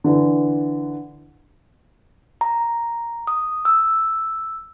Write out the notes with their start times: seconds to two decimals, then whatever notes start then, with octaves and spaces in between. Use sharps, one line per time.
0.04 D3 E3
2.41 A#5
3.27 D#6
3.65 E6